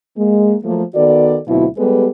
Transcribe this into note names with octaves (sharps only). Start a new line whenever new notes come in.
G#3 A#3
F3 F#3 A3 A#3
D#3 B3 F#4 A4 D5
D2 B2 F#3 C4 E4 F4
G3 G#3 B3 G4 A4 B4